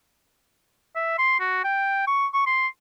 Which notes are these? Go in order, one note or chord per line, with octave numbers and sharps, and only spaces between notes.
E5
C6
F#4
G5
C#6
C#6
C6